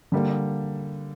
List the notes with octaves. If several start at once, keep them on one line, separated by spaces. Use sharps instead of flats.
D3 G3 A#3